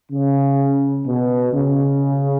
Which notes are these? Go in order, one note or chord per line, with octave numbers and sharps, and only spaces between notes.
C#3
B2
C#3